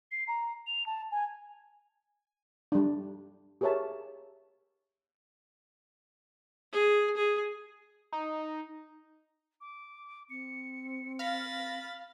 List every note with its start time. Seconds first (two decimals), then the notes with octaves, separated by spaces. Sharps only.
0.12 C7
0.28 A#5
0.67 F7
0.86 A5
1.11 G#5
2.72 G3 D4
3.61 G4 G#4 A#4 C#5 E5 A5
6.73 G#4
7.17 G#4
8.12 D#4
9.61 D6
10.30 C4 C#7
11.19 F5 B5 A6 A#6